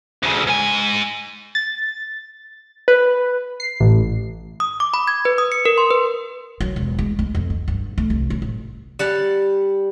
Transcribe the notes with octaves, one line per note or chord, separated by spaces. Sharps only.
D2 C#3
G#2 G#5
A6
B4
C7
A1
D#6
D6
B5
G#6
B4
D#6
C#7
A#4
C6
B4
F#3
E1
G#3
G#3
F2
A3
G2
A3
C2
C#4
A1
G3 F#5 A5